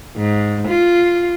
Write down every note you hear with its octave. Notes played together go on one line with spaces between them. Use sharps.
G#2
F4